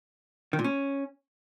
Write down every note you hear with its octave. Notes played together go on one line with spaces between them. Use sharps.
D#3
A#2
C#4